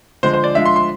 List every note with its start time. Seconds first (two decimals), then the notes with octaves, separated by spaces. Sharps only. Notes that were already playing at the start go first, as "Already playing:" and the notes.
0.23 D3 F3 G#3 C5
0.33 C5
0.44 D5
0.55 F3 G#3 D4 F4 E5
0.66 C6
0.76 C6